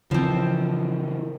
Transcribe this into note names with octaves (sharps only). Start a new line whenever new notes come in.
C#3 E3 F3 C4